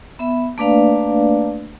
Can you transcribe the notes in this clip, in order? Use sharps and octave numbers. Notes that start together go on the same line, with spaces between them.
B3 E5 B5
A3 A#3 D4 B4 D5 F5